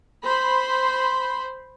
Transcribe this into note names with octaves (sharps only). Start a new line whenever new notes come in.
C5 B5 C6